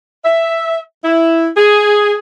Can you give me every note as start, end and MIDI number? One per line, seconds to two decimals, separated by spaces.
0.24 0.78 76
1.05 1.47 64
1.56 2.14 68